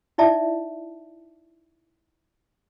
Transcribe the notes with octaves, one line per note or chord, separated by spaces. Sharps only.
D#4 E4 D5 E5 A5